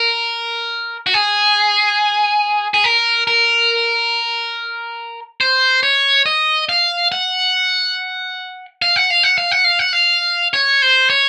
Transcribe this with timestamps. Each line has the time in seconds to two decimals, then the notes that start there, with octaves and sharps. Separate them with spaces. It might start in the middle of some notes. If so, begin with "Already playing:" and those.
Already playing: A#4
1.07 F#4
1.14 G#4
2.74 G#4
2.84 A#4
3.27 A#4
5.41 C5
5.83 C#5
6.26 D#5
6.69 F5
7.12 F#5
8.82 F5
8.96 F#5
9.10 F5
9.23 F#5
9.38 F5
9.51 F#5
9.64 F5
9.79 F#5
9.93 F5
10.54 C#5
10.82 C5
11.10 C#5